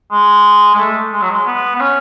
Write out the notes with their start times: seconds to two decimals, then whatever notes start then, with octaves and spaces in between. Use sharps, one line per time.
0.12 G#3
0.75 G#3
0.78 A3
1.12 G#3
1.22 F#3
1.30 G#3
1.46 B3
1.75 B3
1.80 C#4